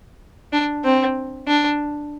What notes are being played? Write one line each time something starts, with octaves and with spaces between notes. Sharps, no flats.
D4
C4
D4